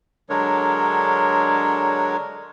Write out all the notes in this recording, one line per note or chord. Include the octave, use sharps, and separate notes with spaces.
D3 F#3 G#3 D4 A#4 C#5